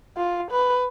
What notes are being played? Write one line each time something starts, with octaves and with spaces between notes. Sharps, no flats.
F4
B4